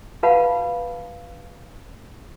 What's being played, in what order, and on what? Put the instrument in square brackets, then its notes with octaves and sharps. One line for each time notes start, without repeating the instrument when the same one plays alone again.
[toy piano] F#4 B4 F5 F#5 A5 B5